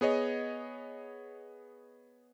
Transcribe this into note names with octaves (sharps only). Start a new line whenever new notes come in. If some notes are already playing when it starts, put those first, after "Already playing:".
B3 G#4 C#5 D#5